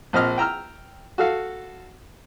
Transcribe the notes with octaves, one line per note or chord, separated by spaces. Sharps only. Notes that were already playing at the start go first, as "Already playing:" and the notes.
A#1 C4 D#5 F6
G5 A#5 E6 F6
F#4 A4 F5